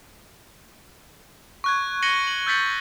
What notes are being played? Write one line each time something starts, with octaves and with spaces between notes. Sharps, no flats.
C#6 F#6 G#6
G#6 A#6 C#7 D#7 F#7 G7
F#7
E6 G6 A6 B6 C#7 F#7